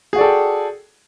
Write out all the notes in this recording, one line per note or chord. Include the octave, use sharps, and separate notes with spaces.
F#4 G#4 A4 D5 G5